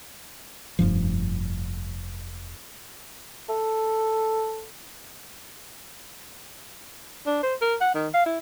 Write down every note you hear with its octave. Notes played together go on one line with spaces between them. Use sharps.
F1 G2 F3
A4
D4
C5
A#4
F#5
D#3
F5
E4